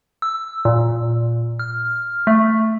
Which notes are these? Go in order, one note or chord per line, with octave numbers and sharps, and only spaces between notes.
E6
A#2
F6
A3